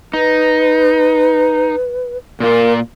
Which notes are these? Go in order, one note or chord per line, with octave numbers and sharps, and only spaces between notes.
D#4 B4
A#2 F4 A#4